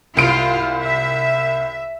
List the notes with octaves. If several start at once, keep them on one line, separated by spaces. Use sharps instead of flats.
C2 F4 D7
E5